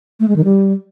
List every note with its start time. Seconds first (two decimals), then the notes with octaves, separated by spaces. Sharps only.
0.20 A3
0.28 G#3
0.36 D#3
0.44 G3